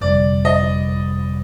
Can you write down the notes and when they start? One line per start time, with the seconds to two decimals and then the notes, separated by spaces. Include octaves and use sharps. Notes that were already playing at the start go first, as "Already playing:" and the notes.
0.01 G1 F2 C3 G3 D5
0.45 D#5